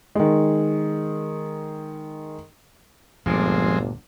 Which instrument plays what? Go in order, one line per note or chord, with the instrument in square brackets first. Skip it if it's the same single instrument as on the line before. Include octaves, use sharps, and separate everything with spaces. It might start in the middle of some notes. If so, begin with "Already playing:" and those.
[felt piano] D#3 G#3
[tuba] G1 [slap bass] D2 A#2 [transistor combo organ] F3 G#3 C4